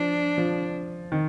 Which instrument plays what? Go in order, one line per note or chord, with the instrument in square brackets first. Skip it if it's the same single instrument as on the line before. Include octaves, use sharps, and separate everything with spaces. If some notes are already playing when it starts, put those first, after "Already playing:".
Already playing: [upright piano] F3 [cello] D4
[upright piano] F3
D#3